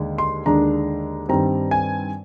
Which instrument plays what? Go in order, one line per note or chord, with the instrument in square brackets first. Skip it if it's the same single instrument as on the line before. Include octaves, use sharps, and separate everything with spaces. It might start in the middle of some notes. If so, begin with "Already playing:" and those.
Already playing: [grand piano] D#2 D3 G#3 D4
C6
D#2 D3 G#3 D4 A#5
G2 D#3 G3 C4 A#5
G#5